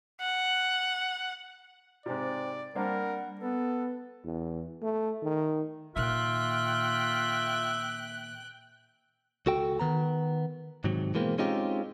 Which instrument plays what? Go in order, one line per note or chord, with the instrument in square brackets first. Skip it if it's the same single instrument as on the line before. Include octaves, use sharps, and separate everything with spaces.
[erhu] F#5
[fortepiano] G#2 C3 [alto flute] C4 [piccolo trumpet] D5
[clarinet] G3 [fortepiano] A#3 C4 D4 [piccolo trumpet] A#4 [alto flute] F#5
[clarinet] B3 [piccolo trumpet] A4 [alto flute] B4
[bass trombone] E2
A3
D#3
[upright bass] A#2 D#3 [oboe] F4 [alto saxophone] E5 [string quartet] G5 F#6
[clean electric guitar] C#2 F#4 A4 G5
D#3 B3 A#5
G#2 C3 D#3 F#3
B2 E3 G#3 A#3 C4
G#3 C4 C#4 D#4 F4 G4